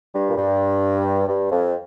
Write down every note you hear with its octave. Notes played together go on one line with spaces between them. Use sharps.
G2
A#2
G2
G2
F2